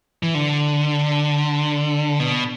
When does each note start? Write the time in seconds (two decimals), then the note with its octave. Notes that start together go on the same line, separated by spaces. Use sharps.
0.23 E3
0.35 D3
2.20 B2